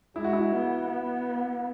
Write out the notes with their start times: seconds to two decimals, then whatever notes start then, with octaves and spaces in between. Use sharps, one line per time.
0.16 G#3 E4
0.24 F#4
0.33 E4
0.52 B3
0.88 B3